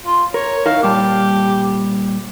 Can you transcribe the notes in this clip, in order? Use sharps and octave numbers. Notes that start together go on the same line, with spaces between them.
F4
A#4 C#5
D#4 E4 A#4 F5
A#2 G3 G4 A5